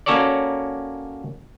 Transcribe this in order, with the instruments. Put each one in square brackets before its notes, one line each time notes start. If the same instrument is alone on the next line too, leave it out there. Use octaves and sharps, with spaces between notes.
[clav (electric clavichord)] A#3 C#4 F#4 A4 C#5 D5